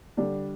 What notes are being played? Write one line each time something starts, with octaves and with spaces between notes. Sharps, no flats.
D3 G3 D4